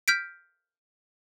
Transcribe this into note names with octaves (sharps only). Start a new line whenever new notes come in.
F6 G6 B6 D7